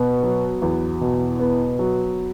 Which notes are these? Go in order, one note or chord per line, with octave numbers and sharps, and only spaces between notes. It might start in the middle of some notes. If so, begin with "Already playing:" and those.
Already playing: B2 B3
F#3
E2
B2
B3
F#3